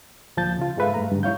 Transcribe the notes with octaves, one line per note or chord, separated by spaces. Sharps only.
D2 A#2 F3 A5 G6 A6
C#3 F4
G#2 G#3 A4 B4 E5 F5
G2 A3 A#5
G2 D3
G#2 E4 C#5 F5 G6